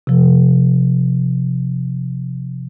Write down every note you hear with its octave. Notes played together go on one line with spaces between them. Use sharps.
C3 F3